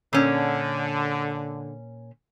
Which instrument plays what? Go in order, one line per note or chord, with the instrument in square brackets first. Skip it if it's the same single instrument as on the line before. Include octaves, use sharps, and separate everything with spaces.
[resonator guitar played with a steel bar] A#2 C#4 [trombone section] D3